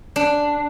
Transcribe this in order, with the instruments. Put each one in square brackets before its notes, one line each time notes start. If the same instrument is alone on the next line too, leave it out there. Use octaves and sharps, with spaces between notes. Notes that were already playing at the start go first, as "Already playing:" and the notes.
[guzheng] D4